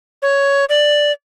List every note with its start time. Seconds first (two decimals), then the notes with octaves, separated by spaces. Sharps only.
0.22 C#5
0.69 D5